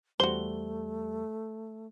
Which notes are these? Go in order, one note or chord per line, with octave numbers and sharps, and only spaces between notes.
E2 G3 A3 F#4 C5 G7